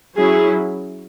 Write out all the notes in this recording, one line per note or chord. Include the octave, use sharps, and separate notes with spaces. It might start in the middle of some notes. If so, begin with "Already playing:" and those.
F#3 C#4 E4 G#4